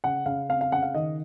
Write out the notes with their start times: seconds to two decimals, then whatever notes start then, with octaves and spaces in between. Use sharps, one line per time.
0.04 C#3 F#5
0.26 C#3 F5
0.49 C4 F5
0.61 F5
0.72 C#3 F#5
0.82 F5
0.94 D#3 D#5